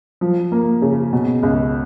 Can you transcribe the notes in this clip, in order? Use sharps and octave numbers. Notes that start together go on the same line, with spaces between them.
F3
A#3
C#3
B2
C#2